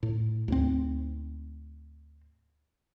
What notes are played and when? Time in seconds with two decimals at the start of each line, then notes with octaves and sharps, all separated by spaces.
0.03 A2
0.48 D2 G#2 C4